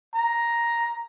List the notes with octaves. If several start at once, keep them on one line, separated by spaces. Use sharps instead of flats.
A#5